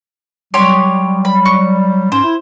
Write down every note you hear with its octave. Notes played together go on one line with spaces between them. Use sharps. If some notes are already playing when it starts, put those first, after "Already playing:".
F#3 G3 G4 C#5 C6
B5
C#6
G#2 C#4 C5
E4